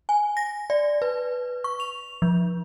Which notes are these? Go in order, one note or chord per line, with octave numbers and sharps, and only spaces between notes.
G#5
A#6
D5
B4
C#6
F7
F3